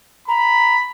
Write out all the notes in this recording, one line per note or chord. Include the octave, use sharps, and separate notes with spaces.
A#5 B5